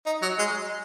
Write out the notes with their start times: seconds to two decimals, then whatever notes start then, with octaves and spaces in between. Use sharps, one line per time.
0.06 D#4
0.22 F#3
0.39 G#3